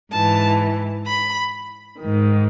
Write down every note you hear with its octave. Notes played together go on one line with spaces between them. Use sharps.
G#2 E3 A5
B5
G#2 D#3